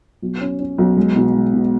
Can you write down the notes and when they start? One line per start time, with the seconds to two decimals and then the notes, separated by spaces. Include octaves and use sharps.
0.22 B1
0.41 C#4
0.59 C#4
0.78 B1
0.97 G#3
1.16 B2
1.34 G#3
1.53 B2